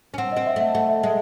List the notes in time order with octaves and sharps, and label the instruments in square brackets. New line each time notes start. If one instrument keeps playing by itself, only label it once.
[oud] C#4
[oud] C4 [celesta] F#5
[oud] C4 [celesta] D#5
[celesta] E5
[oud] A3 [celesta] F#5
[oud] A3 [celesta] F#5
[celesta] E5
[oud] G#3 [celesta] A4